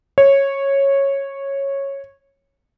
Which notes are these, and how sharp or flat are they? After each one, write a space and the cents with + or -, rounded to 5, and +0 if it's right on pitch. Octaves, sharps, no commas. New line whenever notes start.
C#5 -10